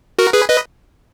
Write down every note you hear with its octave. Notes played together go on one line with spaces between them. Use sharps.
F#4 A#4
G#4 B4
B4 D#5